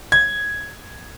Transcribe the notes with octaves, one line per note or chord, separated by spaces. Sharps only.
G#6